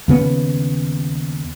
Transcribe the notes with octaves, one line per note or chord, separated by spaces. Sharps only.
D#2 C#3 B3